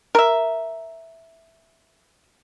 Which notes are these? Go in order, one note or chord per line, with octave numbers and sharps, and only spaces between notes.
A#4 E5